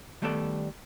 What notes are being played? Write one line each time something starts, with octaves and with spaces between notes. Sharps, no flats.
D#3 G3 A3 B3 A4 D5